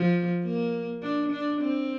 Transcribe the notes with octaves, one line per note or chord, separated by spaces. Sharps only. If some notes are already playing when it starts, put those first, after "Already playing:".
Already playing: F3
A#3
D4
D4
C4